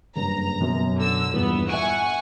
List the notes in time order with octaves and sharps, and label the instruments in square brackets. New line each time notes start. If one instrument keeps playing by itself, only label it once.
[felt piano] F#1 G2 [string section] A#5
[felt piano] F#2 B2
[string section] D3 E6
[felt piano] A#1 E2 G2 [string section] B3
[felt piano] E5 D#7 [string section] F#5 G#5 C#6